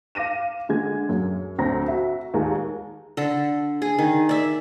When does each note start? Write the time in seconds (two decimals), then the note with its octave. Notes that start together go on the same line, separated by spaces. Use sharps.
0.15 F5 D6 A#6 D#7 E7
0.69 D3 G#3 G#6
1.09 F#2
1.58 D2 C4 A#5 A#6
1.88 F#4 E5
2.34 D#2 G#3 A#5
3.17 D3 A4
3.82 G#4
3.98 D#3
4.29 D5 E5